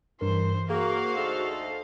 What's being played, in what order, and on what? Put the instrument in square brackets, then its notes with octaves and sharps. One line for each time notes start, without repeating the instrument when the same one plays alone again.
[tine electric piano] G2 A#4 [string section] E3 [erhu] C5
[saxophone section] A#3 [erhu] F#4 [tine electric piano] G#4 [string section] C5 F5
[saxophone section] D2 D#4 A4